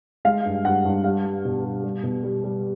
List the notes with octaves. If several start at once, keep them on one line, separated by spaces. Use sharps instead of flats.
G#3 F5
G2
G2 F#5
G2
G3 F5
G3
B2
G3
G3
B2
G3
G3